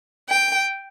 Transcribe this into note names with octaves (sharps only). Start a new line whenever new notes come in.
G5